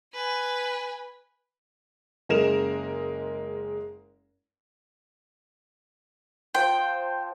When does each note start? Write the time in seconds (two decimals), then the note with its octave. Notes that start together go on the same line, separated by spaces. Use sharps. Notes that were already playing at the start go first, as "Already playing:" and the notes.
0.14 B4 G#5
2.29 F#1 G#3 A#4 E7 F7
6.55 F3 C5 G5 C6